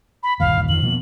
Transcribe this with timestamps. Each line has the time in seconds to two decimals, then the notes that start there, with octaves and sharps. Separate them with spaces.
0.23 B5
0.40 G1 D#2 A#2 F5
0.69 F2 D#3 F3 F#7
0.83 B2 F3 A#3